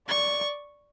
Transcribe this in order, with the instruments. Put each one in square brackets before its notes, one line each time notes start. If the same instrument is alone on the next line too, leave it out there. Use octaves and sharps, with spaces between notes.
[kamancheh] D5 [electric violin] C#6